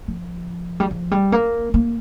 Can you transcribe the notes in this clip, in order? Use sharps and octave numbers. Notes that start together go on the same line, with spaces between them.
F3
G3
F3
G3
A#3
A#3